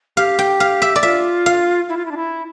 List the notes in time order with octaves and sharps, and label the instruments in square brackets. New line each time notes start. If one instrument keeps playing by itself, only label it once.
[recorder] G4 [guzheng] F5
[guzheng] G5
F5
E5
D5
[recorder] F4 [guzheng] E5
[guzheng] F5
[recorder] E4
F4
E4
D4
E4